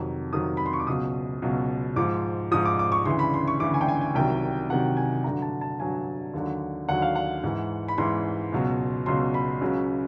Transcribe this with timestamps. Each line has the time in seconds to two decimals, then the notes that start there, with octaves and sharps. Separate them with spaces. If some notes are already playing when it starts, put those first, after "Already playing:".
Already playing: F2 C3 D#3 F#3
0.33 F2 C3 D#3 F#3 D#6
0.57 B5
0.66 C6
0.73 C#6
0.80 D6
0.87 C#2 B2 F#3 D#6
1.42 C#2 B2 F#3
1.96 G#2 F3 D6
2.51 G#2 F3 D#6
2.65 D6
2.79 D6
2.92 C#6
3.05 D2 C#3 E3 C6
3.19 B5
3.34 C6
3.48 C#6
3.60 D2 C#3 E3 D6
3.74 G#5
3.81 G5
3.89 G#5
4.01 G#5
4.15 C2 C3 D#3 F#3 G5
4.69 C2 C3 D#3 F#3 F#5
4.97 G#5
5.24 G2 D3 F#3 A#5
5.42 A5
5.61 A5
5.79 G2 D3 F#3 G#5
6.34 D#2 D3 F#3
6.89 D#2 D3 F#3 F#5
7.02 F5
7.15 F#5
7.43 G#2 E3
7.88 B5
7.98 G#2 E3 C6
8.52 C#2 B2 F#3
9.06 C#2 B2 F#3 C6
9.34 B5
9.61 C#2 C#3 F#3